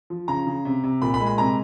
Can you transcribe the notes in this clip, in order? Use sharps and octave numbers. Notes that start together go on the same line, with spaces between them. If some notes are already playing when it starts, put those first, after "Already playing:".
F3
C#3 A#5
C#3
C3
C3
A#2 B5
B5
G#3
B5
C3 A#5